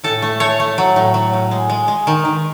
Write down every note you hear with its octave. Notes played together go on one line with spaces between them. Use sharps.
A2 A4
A3
A3 C#5
A3
F#3
A2
F#3
A2
G#3
G#3
G#3
D#3
D#3